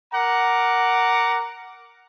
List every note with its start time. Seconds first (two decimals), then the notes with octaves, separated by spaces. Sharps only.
0.14 A#4 F#5 A#5 D6